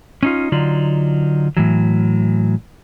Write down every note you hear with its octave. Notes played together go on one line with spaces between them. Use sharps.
C#4 D#4 F4
D3 F#3 D#4 F4 D5
A2 E3 F#3